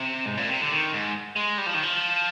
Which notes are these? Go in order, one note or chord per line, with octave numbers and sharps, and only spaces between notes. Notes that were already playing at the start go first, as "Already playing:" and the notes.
Already playing: C3
G#2
A#2
C3
D3
D#3
G#2
G#3
G3
F3
D#3
F3